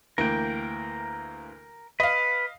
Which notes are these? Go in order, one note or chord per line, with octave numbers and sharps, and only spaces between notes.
D2 E3 A#3 A#4 G5
B4 D#5 F5